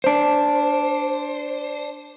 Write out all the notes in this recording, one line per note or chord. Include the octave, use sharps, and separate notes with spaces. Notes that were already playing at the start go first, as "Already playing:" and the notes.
D4 C5